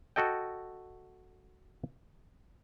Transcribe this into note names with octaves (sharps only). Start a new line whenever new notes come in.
F#4 A4 D#5 G5